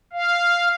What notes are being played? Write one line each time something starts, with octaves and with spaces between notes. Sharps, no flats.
F5